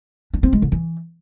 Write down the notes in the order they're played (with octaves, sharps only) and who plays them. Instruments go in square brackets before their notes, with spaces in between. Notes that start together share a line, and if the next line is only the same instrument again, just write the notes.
[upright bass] D4
C4
G#3
D3
E3